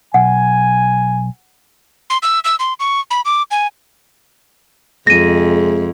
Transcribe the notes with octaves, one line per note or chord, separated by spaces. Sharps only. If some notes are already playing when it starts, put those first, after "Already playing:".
B1 F#5 G#5
C6
E6
E6
C6
C#6
B5
D6
G#5
F2 C3 G#3 A#6 D#7